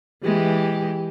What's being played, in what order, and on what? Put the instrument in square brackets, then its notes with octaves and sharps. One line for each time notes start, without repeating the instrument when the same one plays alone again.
[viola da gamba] E3 G#3 G4